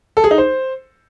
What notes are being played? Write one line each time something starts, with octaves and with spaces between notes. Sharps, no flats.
A4
G#4
D#4
C5